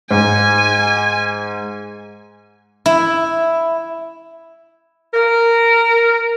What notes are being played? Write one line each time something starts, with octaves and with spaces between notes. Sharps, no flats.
G#2 G#5
E4
A#4